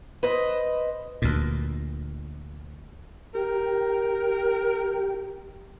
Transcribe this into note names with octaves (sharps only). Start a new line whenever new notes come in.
B4 C5 D#5
D2 A#2
G4 A#4